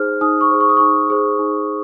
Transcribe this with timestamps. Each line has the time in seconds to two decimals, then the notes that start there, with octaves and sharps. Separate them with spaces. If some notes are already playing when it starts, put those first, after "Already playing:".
Already playing: D#4 G#4 C5 F6
0.21 D#4 D#6
0.41 C#6
0.51 G#4 C5
0.60 C#6
0.69 D#6
0.77 D#4 C#6
1.10 G#4 C5
1.39 D#4